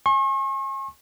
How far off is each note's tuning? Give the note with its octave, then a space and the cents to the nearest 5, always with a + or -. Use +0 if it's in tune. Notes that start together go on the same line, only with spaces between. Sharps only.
G#5 +10 C#6 -45